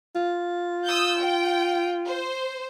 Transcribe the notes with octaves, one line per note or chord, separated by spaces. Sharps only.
F4
D#6 E6 G6
G5
C5